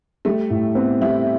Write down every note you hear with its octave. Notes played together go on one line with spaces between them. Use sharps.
G3 A3
A2
B3 C4
G3 E4